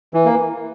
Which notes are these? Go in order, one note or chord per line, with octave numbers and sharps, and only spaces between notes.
E3
A#3